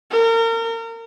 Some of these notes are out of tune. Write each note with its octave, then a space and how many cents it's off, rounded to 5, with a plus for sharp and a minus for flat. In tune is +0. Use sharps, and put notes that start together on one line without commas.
A#4 -35